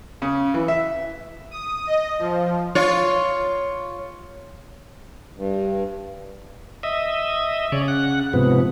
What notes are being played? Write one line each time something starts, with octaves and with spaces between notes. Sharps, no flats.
C#3
E3
E5
D#6
D#5
F3
F4 C#5
G2
D#5 E5
C#3 C#5 D5
F#5
G#2 C3 F3 B3